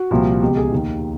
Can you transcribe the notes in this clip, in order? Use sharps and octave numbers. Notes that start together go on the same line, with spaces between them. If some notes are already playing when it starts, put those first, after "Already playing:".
Already playing: F#4
C2 A#2 F3
C#2 B2 G4
G#4
D#2 D#3